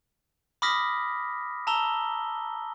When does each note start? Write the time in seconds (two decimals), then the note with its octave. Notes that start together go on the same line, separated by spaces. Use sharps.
0.62 B5 D6 D#6 F6 A#6 B6
1.67 A5 A#5 E6 G7